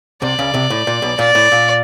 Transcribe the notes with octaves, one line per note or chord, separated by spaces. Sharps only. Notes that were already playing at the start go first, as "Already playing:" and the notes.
C2 C3 D5
C#2 C#3
C2 C3
A2
A#2
B1 B2
A#2 D5
A2
A#2